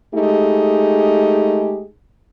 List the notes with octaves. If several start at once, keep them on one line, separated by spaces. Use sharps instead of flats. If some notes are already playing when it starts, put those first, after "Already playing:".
G#3 A3 D#4 G4 G#4